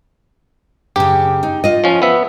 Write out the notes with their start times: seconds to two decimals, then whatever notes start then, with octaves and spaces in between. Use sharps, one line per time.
0.96 F#2 C#3 G4
1.43 D#4
1.64 F4 D#5
1.84 F3 C#4
2.02 B3 E5